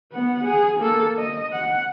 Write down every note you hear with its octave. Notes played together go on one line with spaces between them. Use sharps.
B3 F#5
G#4
A#3 A4
D#5
F#5